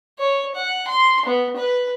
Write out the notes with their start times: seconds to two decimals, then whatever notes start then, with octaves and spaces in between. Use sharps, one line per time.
0.19 C#5
0.55 F#5
0.88 C6
1.25 B3
1.57 B4